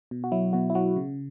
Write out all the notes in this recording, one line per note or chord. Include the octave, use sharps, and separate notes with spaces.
B2
F#4
F#3 E4
B2 F#4
E4
F#3 F#4
C#3